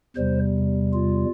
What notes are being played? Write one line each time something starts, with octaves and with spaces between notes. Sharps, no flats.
E2 C3 G3 C5
F4